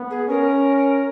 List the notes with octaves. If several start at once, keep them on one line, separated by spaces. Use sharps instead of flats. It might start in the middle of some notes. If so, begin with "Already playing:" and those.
Already playing: B3
G#4
C#4 A#4